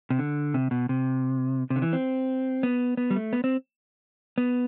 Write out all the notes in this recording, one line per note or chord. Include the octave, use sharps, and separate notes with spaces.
C3
D3
C3
B2
C3
C3
D3
E3
C4
B3
B3
G3
A3
B3
C4
B3